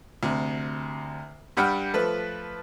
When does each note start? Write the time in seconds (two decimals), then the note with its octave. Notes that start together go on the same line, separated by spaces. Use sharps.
0.23 D2 C3
1.57 G2 G3 F#5 G5 B5 F6
1.94 F3 A3 B4